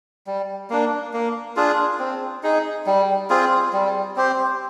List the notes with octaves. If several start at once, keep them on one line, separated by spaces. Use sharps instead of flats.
G3
A#3 D4
A#3
D4 F4 G#4
C4
D#4 G#4
G3
C4 F4 G#4
G3
C4 G4 C5